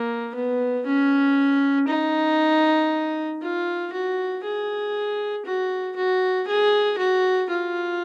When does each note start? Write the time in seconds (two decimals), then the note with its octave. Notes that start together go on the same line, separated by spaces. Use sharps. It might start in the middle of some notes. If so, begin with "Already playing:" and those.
Already playing: A#3
0.35 B3
0.86 C#4
1.88 D#4
3.42 F4
3.93 F#4
4.44 G#4
5.46 F#4
5.96 F#4
6.48 G#4
6.98 F#4
7.50 F4